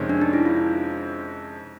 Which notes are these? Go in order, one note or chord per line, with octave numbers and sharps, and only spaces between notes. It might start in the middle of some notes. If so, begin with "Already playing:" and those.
Already playing: F2 C3 D#3 G#3 C#4
D4
D#4
E4
F4